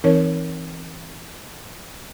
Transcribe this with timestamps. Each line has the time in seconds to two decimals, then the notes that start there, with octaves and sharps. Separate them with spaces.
0.04 E3 C4 D#4 A#4 C#5